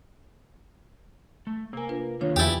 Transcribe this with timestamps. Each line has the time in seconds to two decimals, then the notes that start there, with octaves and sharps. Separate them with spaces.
1.47 A3
1.73 C3 A#3 A#4 G#5
1.89 D4 F4 B4
2.21 D3 D#3 A#3 D4 F4 C#5
2.36 E2 E4 G4 G#5 G6 A6